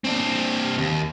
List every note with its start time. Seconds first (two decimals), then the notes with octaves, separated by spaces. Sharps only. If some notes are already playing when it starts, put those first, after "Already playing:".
0.04 C4 D4
0.78 D#2